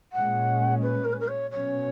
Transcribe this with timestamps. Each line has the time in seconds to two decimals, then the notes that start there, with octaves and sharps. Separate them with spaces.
0.13 A#2 G#3 C#4 F#5
0.82 B4
1.04 A#4
1.13 B4
1.20 A#4
1.28 C#5
1.50 B2 F#3 C#4 C#5